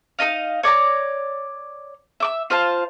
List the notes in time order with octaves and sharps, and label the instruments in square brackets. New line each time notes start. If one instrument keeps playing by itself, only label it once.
[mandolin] D#4 A#4 D#5 F5
C#5 D5 A5 A#5
E5 D6 E6
F4 C5 F5 A5